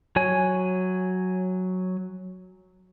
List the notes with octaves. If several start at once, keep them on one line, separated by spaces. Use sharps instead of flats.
F#3 C#5 G#5